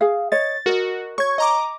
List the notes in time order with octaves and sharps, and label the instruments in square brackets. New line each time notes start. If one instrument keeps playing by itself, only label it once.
[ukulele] G#4 F5
[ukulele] C#5 D#5 [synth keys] A6
[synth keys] F#4 [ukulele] A#4 D#5
[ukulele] C#5 [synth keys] C#6 G#6
[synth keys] D#5 A#5 D6